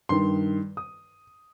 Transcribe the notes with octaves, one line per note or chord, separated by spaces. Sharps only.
G2 D#3 C6
D#6